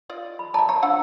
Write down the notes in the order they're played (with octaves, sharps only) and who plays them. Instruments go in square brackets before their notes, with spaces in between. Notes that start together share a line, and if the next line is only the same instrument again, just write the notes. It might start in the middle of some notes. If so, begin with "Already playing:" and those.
[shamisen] F4 D5 D#5
[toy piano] B5
[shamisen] D5 E5 [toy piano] A5 A#5
[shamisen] C#5 [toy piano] A#5
[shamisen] F3 D4 F#5 [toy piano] E6